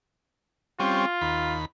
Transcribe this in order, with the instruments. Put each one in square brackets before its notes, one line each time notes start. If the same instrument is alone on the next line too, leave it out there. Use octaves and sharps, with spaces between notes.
[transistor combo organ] G3 C4 C#4 [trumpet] F4
[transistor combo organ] D#2 B5